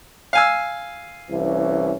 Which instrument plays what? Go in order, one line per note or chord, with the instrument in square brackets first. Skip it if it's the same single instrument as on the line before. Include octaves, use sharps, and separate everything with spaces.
[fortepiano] F5 G#5 E6
[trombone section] C2 E3 C#4